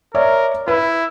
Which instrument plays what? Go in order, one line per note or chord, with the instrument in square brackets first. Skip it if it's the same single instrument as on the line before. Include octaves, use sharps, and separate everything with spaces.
[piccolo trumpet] A#4 [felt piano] C#5 D5 E5
[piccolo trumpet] E4 [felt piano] B4